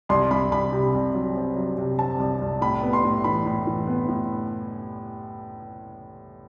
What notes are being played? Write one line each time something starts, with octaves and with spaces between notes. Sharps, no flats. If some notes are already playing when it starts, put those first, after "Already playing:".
C2 C6
C2 B5
C2 B5
C3
C2
F#3
C4
F#3
C3
C4 A5
C2
C2
A2 B5
B3
C6
A2
E3 B5
A2
E3
B3
A2